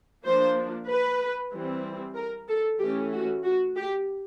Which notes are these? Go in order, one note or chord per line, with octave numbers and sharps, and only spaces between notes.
F3 A#3 D4 C5
B4
E3 G3 C4
A#4
A4
E3 A3 C#4 G4
F#4
F#4
G4